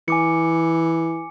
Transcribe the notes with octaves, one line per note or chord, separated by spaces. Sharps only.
E3 G#5 D6 C#7